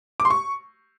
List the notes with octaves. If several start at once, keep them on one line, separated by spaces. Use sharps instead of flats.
D6
C6
C#6